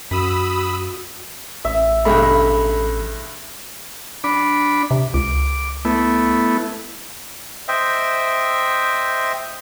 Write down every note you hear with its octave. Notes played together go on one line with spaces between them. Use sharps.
F#2 F#4 B5 D#6 E6
A1 E5
B1 G2 G#3 A4 B5
D4 B5 D6
C3
C#2 D6
A3 B3 E4
C5 D#5 E5 G5